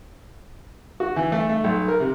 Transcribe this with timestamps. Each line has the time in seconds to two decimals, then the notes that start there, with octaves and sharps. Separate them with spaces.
1.00 F#4
1.16 E3
1.32 A3
1.49 A3
1.64 B1
1.88 A#4
2.00 C3